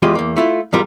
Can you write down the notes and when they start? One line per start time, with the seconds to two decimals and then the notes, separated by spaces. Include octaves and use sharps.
0.02 E2 G#3 F4 G4 D#5
0.15 E2 A#3
0.36 A3 E4 F4
0.73 E2 G#2 G3 F4 A#4